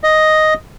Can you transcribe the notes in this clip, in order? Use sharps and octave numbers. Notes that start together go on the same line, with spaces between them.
D#5